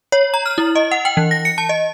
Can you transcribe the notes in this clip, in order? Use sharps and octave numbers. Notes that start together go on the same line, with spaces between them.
C#5
A#5
F6
E4
D#5
F#5
G5
E3
A#6
C#7
A5
D#5